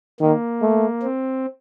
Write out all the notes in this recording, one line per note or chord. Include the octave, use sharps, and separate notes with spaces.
D#3 A#3
A3
C4